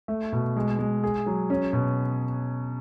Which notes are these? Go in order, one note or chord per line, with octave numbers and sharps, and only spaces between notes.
A3
B2
G#3
G#3
G#4
F#3
C#4
B2